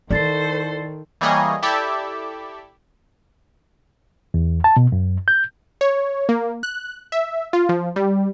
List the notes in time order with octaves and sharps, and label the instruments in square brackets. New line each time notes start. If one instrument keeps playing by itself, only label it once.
[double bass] D#3 [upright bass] E4 [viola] A4 C5 [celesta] D5 A6 C7
[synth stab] E3 G3 A#3 G#4 C#5 D#5
E4 G4 A4 D5 E5
[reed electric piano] E2
A5
B2
F#2
G6
[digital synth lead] C#5
A#3
F#6
E5
F4
F3
G3